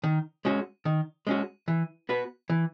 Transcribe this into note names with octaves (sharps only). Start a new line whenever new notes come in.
D#3
G#3 C#4 F#4
D#3
G#3 C#4 F#4
E3
B3 F#4 B4
E3